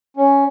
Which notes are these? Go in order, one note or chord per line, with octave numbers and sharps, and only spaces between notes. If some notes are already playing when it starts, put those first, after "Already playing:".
C#4